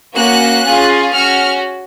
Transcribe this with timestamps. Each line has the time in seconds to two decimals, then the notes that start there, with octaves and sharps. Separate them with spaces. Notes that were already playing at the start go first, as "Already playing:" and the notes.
0.15 A#3 C#4 F#4 F#6
0.65 C#4 F4 G#4
1.13 C#4 F#4 F6